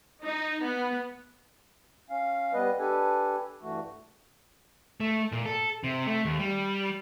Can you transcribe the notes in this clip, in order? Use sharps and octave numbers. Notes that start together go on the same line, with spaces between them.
D#4
B3
C#4 F5
G3 B3 B4 D#5
D4 G4 A4 B4 G#5
G2 E3 A3 F#4
A3
A#2
A4
C3
A3
D#2
G3